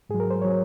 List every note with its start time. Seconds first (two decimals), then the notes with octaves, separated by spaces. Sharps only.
0.09 G#2 F#3 G#4
0.20 A#4
0.30 C5
0.42 F#3 C#5